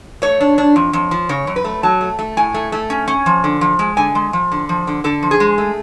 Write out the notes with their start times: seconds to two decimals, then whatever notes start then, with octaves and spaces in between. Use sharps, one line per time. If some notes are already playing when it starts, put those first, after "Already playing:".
0.22 A3 C#5
0.41 D4
0.58 D4
0.76 F2
0.93 F2
1.11 F3
1.29 C#3 C#5
1.47 F#2
1.56 B4
1.64 A3
1.83 F#3 A5
2.01 A3
2.19 A3
2.37 A2 G#5
2.54 A3
2.72 A3
2.90 C#4
3.08 C#4
3.26 F3
3.44 D3
3.61 F3
3.79 G#3
3.97 D3 G#5
4.15 G#3
4.33 F3
4.52 D3
4.69 F3
4.87 D3
5.04 D3 A4
5.23 F3
5.31 G#4
5.40 G#3
5.58 A3